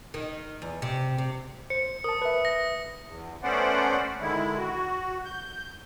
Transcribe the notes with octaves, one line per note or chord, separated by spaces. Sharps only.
D#3
E2
C3
C3
C5 C#7
A#4 A5 D#6
B4 E5
A#6
E2
A3 B3 C#4 C5 D5 F#5
D3 D#3 G#3 E4
F#4
G6